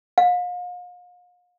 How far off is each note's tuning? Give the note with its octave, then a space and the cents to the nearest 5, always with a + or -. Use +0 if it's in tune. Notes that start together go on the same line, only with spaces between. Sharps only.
F5 +40